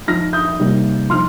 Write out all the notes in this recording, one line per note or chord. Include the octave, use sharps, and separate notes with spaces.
F3 D#4 F6 A#6
D#6 G6
C3 G3 A#3 D#4
F3 D#4 C6 F6